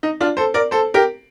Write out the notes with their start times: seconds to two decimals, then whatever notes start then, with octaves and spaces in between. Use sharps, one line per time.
0.03 D#4
0.21 D4 F4
0.37 A4 C5
0.54 A#4 D5
0.71 A4 C5
0.94 G4 A#4